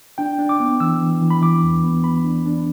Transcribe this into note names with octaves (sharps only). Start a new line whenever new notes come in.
D4 G5
D4
D6
B3
E3 E6
E3
E3
B5
E3 D6
E2
B3
B3 B5
D4
D4